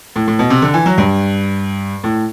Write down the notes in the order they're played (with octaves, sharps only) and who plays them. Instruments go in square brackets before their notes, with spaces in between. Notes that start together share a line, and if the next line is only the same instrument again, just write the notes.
[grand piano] A2
A2
B2
C3
D3
E3
F#3
G2
A2